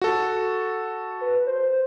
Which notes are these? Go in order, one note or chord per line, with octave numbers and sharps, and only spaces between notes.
F#4 A4
B4
C5